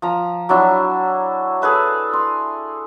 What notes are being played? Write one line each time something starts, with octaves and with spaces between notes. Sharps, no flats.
F3 A#5
F#3 D4 E4
G#4 A4 B4 E5
C6